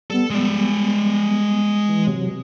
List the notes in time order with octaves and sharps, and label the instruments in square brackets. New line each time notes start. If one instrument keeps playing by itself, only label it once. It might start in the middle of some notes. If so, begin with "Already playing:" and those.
[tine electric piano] G3 B3 [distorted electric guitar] A4
[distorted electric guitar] G#3 D5
[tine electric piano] E3
C3 F#3